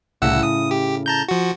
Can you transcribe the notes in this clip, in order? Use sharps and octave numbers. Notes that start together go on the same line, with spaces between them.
C2 A2 C#3 F#5 E6
D#6
G4
A5 A#5 G6
F3 F#4